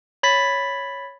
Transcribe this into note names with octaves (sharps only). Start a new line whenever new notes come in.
C#5 B5 A6 B6